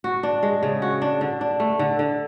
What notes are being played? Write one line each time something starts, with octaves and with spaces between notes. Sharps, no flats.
F#4
D4
G#3
C#3
F#4
D4
D3
D4
A3
D3
D3